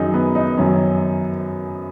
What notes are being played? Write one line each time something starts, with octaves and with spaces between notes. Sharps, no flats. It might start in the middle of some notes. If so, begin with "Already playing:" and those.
Already playing: F#2 D#3 F#3 D#4 G#4
B3
D#4
F#2 D#3 F#3 C#4